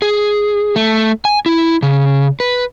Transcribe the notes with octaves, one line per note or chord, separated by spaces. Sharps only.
G#4
A3
G#5
E4
C#3
B4